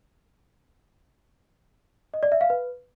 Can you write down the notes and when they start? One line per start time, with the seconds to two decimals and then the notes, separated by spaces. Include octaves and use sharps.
2.14 D#5
2.23 D5
2.32 E5
2.41 F5
2.50 B4